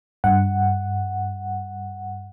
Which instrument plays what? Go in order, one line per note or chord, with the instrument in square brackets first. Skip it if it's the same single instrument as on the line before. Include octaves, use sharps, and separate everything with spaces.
[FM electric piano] G2 F#5